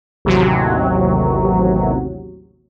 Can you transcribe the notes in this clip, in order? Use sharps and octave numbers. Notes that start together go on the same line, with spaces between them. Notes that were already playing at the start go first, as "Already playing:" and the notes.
A1 D#2 C3 F#3